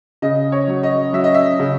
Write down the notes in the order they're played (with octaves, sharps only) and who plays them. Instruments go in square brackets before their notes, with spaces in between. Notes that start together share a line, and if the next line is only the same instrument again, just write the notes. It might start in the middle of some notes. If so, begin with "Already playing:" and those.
[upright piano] C#3 D#5
C#5
F#3
D#5
F#3 E5
D#5
E5
C#3